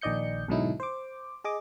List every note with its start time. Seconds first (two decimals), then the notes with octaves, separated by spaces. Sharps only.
0.01 A#1 D#3 D5 D#5 G6 C#7
0.48 B1 G#2 D3 F#3 D#4 E4
0.80 C5 D6
1.44 G#4 D#5 D6